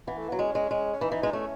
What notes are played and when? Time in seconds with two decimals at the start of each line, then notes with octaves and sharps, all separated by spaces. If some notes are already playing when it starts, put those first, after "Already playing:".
0.07 E3 B3
0.18 A3
0.28 F#3 B3
0.39 G#3 C#4
0.55 G#3
0.71 G#3
0.93 C#4
1.01 E3 D#4
1.12 E3
1.23 G#3 D#4
1.33 A3 C#4